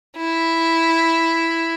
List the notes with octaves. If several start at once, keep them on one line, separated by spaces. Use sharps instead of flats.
E4